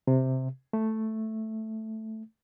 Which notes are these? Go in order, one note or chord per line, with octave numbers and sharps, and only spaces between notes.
C3
A3